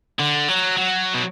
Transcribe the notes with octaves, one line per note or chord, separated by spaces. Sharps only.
D3
F#3
F#3
B2